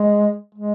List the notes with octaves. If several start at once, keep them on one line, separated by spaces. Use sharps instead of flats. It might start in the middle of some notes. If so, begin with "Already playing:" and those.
Already playing: G#3
G#3